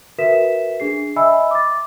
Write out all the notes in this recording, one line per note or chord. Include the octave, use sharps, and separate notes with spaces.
F#4 A#4 B4 E5 B6 E7
D4 G#4 C7
D#5 E5 G#5 B5 E6
D6 A6